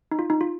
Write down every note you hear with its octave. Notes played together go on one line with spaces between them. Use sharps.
D#4
F4
D#4
F4